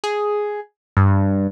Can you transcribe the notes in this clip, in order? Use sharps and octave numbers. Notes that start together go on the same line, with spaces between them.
G#4
G2